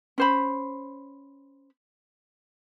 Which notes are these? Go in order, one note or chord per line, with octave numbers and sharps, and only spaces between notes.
C#4 C5 B5